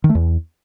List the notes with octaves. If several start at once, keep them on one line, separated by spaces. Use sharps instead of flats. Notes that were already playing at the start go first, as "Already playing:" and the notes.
D#3
A3
E2